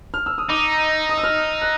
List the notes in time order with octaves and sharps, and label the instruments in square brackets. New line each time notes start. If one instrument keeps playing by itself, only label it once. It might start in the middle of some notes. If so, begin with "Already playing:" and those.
[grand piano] F6
E6
D#6
[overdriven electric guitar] D#4 [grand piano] D6
[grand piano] D#6
E6
F6
F#6